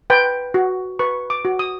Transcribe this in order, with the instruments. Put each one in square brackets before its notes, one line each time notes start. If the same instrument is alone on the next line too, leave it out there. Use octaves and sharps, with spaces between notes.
[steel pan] B4 G5
F#4
B4 C#6
D6
F#4
D#6